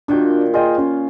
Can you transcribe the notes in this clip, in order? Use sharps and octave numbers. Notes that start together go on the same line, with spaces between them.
A#2 D#3 D4 F#4 G5
F4 G#4 D#5 G5
C#4